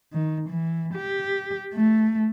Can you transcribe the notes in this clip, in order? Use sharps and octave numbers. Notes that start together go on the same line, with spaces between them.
D#3
E3
G4
A3